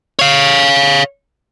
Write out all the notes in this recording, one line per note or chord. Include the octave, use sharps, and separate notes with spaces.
C#5 F5